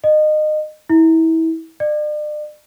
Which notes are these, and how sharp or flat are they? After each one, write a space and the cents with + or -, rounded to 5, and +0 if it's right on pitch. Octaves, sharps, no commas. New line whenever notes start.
D#5 -25
E4 -30
D5 +40